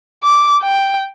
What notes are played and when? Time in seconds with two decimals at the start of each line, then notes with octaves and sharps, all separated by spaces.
0.24 D6
0.63 G5